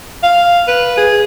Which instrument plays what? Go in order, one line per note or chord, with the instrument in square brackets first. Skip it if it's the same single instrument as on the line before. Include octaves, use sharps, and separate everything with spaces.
[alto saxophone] F5
B4
G#4